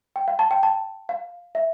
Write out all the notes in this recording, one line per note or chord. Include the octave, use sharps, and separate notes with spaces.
G5
F5
A5
G5
A5
F5
E5